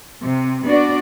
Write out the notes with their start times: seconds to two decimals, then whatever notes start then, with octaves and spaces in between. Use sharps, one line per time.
0.24 C3
0.66 B3 D4 F#4 D5